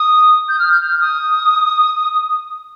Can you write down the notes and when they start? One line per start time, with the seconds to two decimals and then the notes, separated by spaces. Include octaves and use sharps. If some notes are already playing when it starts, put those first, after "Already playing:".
Already playing: D#6
0.49 G6
0.59 F6
0.72 G6
0.81 F6
1.00 D#6